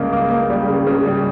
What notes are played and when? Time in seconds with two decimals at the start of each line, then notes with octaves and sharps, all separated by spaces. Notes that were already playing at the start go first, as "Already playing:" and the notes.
Already playing: C#2 C#3 G3 A#3
0.13 A#3
0.31 A#3
0.50 G3
0.68 C#3
0.87 C#3
1.05 G3